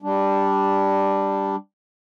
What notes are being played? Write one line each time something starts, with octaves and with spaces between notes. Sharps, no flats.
G3 D4